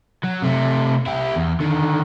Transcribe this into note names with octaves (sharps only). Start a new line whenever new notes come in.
F#3
C3 A3
E4 G4
E2
D3 D#3